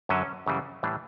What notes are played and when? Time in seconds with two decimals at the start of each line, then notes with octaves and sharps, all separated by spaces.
0.09 F#2 D3 F#3 C#4
0.46 F#2 C#3 E3 G3
0.83 A2 E3 G3 D4